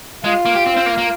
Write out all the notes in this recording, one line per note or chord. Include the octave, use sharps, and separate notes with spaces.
G#3 F4
A#3
G4
C4
C4
A#3
A#3